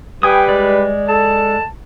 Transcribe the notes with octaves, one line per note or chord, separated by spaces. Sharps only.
G3 B4 G5 G#5 D#6
G#3 D5
A4 A5